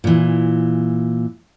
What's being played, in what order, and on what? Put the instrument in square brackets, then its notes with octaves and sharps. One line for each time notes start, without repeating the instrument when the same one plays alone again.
[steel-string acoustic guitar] A#2 E3